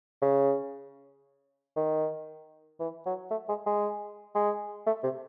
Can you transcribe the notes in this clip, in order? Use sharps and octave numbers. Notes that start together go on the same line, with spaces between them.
C#3
D#3
E3
F#3
A3
G#3
G#3
G#3
A3
C3